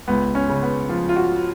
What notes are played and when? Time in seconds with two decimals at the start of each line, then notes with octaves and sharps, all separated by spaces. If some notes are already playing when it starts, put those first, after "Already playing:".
0.08 C#2 B3
0.35 C#4
0.49 C#3
0.63 B3
0.89 F3 F4
1.09 F4
1.16 F#4